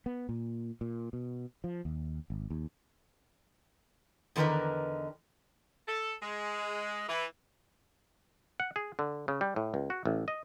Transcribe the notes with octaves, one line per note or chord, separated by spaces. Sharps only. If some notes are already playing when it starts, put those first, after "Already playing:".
B3
A#2
A#2
B2
F3
D#2
G#1
D#2
E2 D3 D#3 A#4 B4 D#5
A4
G#3
E3
F#5
G#4
D3
C#3
G3
A2
C#2
F#4
A1
D#5